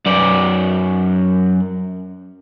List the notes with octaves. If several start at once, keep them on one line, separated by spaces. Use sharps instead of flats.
F#2 D5